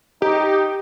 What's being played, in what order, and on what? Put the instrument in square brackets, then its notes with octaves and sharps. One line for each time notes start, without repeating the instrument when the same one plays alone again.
[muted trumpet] D#4 [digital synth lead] G4